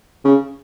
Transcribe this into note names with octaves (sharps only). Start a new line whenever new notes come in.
C#3